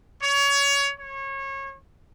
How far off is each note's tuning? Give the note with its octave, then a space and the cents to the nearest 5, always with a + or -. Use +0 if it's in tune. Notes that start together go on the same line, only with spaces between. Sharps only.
C#5 +25
C#5 -25